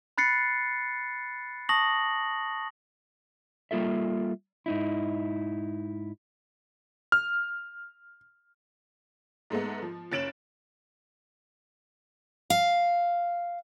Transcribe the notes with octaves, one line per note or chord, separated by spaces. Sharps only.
B5 F#6 A6 C7 C#7
A5 C#6 D#6 A#6 F#7
G3 A#3 F4 A4 E5
G#2 D#4 E4
F6
G#2 G#3 A3 B3
F3
F#1 C#4 A6 D7 E7 F#7
F5